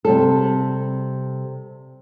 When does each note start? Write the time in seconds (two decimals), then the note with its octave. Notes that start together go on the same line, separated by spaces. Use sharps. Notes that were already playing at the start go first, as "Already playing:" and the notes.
0.05 C3 G3 A4